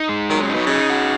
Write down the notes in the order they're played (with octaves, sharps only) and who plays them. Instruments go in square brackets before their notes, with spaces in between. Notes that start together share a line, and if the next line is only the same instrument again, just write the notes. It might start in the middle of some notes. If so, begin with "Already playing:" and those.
Already playing: [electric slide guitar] D#4
G#3
[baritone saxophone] D#3 [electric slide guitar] F#3
[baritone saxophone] C#3
[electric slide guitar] D#4
[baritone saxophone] B2
[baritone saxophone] C#3 [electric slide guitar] D#4
[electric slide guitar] F#4